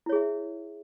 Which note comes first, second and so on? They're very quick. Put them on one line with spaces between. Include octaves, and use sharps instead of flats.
E4 C#5 G#4 E5